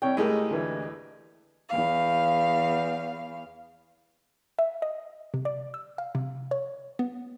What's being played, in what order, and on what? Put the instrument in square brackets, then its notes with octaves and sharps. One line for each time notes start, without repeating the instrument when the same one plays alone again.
[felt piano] C2 C#5 C#6 [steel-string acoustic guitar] G5
[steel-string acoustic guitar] D#2 G#4 D#5 [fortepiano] A2 G#3 G4 [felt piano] A3 A#4
[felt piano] D2 E3
[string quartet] E2 F5
[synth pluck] E5
D#5
C3
D5
E6
F5
C3
C#5
B3